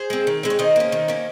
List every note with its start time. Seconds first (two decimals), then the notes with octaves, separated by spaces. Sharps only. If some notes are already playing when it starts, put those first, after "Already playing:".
Already playing: G#4 C5
0.10 G#3 C4
0.27 D#3
0.43 G#3 C4
0.50 C#5
0.59 D#3 C5 D#5
0.76 A#3 C#4
0.92 D#3
1.08 A#3 C#4